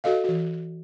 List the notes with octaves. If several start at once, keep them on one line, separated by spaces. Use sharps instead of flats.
F#4 A4 D#5 F5
E3 F#4